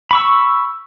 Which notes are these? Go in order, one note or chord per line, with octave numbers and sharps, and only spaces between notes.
B5 C#6 E6